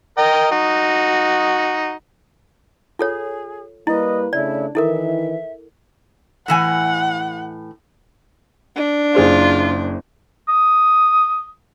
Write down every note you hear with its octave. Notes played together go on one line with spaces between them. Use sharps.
A#4 D#5 G5
D#4 F#4
F4 G#4 A4 C#5
G3 A#3 E4 B4 D#5
C#3 A3 D4 E4 D5
D#3 E3 E4 A4 A#4 E5
A2 E3 F#5 G#5
D4
F#1 F4 G#4 C5
D#6